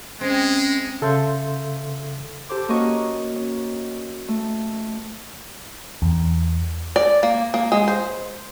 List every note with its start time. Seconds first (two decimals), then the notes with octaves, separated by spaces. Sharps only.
0.21 G#3 C4 C#4
1.02 C#3 A4 E5 F5 C6 G6
2.49 G4 A4 C5 D6
2.69 A#3 C#4 F#4 D#5 C#6 F6
3.36 C#4
4.28 A3
6.02 E2
6.96 D5
7.23 A#3
7.54 A#3
7.72 G#3
7.88 C5